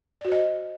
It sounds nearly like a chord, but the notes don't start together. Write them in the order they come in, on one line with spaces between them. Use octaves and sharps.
D5 F#4 C5 D#5